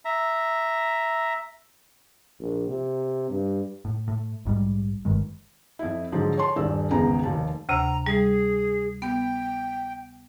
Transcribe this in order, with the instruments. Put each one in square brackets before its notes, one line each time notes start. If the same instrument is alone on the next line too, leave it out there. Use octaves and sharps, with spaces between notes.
[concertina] E5 A#5
[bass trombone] A#1
C3
G2
[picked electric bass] A2
A2
A#1 G#2 C3 G3
G1 G2 D#3 G#3
[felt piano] F2 E4
G#2 D3 F3 F#3 G#4
C#5 G#5 A5 C6
D#1 G2 D5 E6
G#1 E2 C#3 B3 A#5
F1 D#2 A5
[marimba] D2 C3 [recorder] A#5
[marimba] G3 [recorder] G#4
[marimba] B3 [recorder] G5